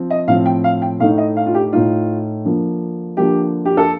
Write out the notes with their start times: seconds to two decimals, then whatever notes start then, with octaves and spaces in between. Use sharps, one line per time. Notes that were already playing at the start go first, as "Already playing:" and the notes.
Already playing: F3 C4
0.10 D#5
0.27 A2 F3 C4 F5
0.46 G5
0.64 F5
0.82 G5
1.00 A2 A3 D#4 F5
1.18 D#5
1.37 F5
1.46 F4
1.54 G4
1.72 A2 A3 D#4 F4
2.45 D3 F3 A#3
3.17 D3 F3 A#3 G4
3.65 G4
3.77 A4